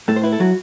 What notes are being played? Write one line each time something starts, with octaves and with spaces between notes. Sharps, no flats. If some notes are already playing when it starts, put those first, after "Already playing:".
A2 A4
C5
E4 B4
A4
F#3 F#4